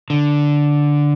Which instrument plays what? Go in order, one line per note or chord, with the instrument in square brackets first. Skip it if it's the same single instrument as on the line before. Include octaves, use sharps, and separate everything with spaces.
[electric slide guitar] D3